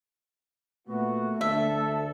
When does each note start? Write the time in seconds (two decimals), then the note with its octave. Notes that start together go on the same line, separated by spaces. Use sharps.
0.87 A#2 A3 B3 F#4
1.41 D2 D4 A4 E5